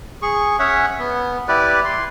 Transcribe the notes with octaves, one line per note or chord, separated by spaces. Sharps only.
G#4 C#6
C#4 C#5 E5 F#5
B3
E4 G4 B4 D5
C6